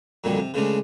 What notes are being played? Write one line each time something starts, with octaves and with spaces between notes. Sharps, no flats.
F2 A#2 D3 D#3 F#3 G3
C3
C#3 E3 G#3 A3 C#4 D4